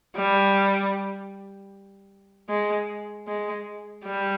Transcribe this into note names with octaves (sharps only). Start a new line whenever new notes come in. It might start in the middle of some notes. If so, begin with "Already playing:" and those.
G3
G#3
G#3
G3